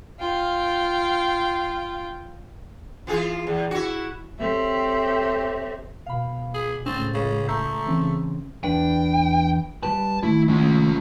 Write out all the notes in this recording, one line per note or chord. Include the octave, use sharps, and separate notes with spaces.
F4 G5
E3 F4 G#4
E2
E4 F#4
C4 G4 A4 C#5 E5
B2 F5 B5
G#4 F#7
C#2 A2 C4 C#4 A6
C#3
A3 A#5 E6 G6
C#3 E3 C4 C#4
E2 D4 B4 G5
G3 G4 B4 A5
D#3 A3 E4
C#4 F4